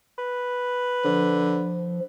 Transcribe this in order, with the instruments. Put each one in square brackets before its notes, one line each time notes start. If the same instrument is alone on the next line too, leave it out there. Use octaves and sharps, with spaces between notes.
[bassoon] B4
[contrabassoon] D3 [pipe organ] F3